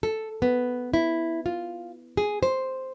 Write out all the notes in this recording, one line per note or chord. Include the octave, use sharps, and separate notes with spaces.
A4
B3
E4
F4
G#4
C5